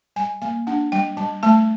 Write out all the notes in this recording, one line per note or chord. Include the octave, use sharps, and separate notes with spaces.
G3 G#5
A#3 G#5
D4 F#5
G3 G5
G3 A5
A3 A5